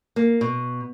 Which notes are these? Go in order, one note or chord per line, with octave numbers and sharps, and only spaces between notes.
A#3
B2